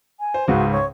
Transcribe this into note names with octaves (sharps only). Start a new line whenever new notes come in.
G#5
C5
C#2 G#2 C#3 F#4
C#5